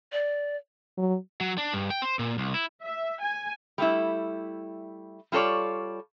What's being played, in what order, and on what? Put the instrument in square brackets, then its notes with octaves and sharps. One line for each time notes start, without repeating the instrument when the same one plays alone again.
[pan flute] D5
[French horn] F#3
[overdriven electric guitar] F#3
D4
G2
G5
C5
A#2
C2
E4
[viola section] E5
G#5
[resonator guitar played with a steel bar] G3 A3 E4
G3 F4 A4 C#5 D5